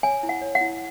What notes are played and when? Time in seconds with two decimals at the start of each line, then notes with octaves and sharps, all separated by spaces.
0.03 C#5 G#5
0.23 E4
0.29 F#5
0.42 C#5
0.55 F#5
0.61 E4